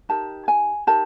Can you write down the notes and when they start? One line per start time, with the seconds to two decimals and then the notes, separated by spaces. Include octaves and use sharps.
0.09 D#4 G4 A#4 A5
0.48 G#5
0.87 D#4 G4 A#4 A5